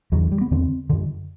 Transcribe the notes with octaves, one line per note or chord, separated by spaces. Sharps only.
E2 D3 F#3
E3
G3
B3
E2 D3 C4
F#2 D3